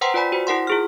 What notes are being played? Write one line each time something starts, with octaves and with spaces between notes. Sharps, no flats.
B4 C5 F#5 G5 A#5 C6
F4 B4 D5 G#5 B5 B6
F#4 C5
E4 A#4 F#5 C6
F4 G#4 F6